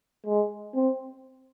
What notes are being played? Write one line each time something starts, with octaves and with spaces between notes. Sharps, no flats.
G#3
C4